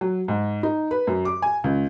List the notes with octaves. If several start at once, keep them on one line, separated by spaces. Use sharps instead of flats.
F#3
G#2
D#4
B4
F#2
D6
G#5
C#2